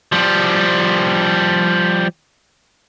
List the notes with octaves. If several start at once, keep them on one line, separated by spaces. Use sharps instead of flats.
F3 G3